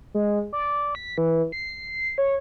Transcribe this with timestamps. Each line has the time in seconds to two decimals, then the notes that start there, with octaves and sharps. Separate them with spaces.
0.14 G#3
0.53 D5
0.95 B6
1.18 E3
1.52 C7
2.18 C#5